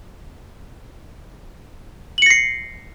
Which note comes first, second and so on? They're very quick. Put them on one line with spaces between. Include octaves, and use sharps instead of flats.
F#7 C#7 A#6 C7